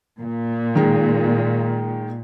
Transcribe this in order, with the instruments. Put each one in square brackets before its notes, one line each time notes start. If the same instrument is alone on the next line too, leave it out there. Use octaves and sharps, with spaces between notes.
[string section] A#2
[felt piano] D#3 G#3